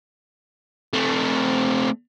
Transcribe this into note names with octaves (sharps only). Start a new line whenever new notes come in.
A3 C4